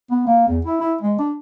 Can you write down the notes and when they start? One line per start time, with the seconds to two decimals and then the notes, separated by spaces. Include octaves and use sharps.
0.11 B3
0.26 A#3
0.48 E2
0.65 E4
0.80 E4
1.01 G#3
1.18 D4